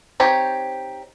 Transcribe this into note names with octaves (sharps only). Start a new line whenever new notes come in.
C4 D#4 G4 C#5